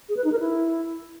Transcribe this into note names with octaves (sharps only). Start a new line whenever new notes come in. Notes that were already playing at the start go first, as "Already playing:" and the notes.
G#4
B4
D#4
A#4
E4